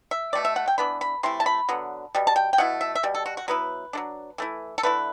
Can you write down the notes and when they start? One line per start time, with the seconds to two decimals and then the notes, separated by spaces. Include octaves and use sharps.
0.11 E5
0.33 B2 A3 C4 D5
0.45 E5
0.56 F#5
0.67 G5
0.78 E3 B3 D4 B5
1.01 B5
1.23 C3 E3 A3 E4 C6
1.40 A5
1.46 B5
1.69 D3 F#3 B3
2.15 B2 G3
2.27 A5
2.36 G5
2.53 G5
2.58 B2 A3 E4 F#5
2.81 E5
2.95 E5
3.03 B2 G3
3.15 A4
3.26 F#4
3.37 F#4
3.48 F#3 B3 E4 B4
3.93 F#3 A3 D4
4.38 E3 A3 E4
4.78 A4
4.83 D3 A3 E4 B4